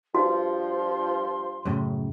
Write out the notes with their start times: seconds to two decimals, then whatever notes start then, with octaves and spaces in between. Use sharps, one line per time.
0.15 G2 F3 F#4 C6
1.65 F#2 A2 C#3